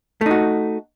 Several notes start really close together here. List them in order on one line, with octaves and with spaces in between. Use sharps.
A3 D#4 F#4